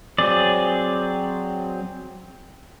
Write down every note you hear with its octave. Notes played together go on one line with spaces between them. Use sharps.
F#3 C4 G#4 D5